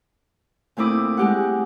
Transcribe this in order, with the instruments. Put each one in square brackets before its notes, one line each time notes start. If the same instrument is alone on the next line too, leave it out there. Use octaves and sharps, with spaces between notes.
[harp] A#2 A3 C4 E4 D6 D#6
G#3 G4 F#5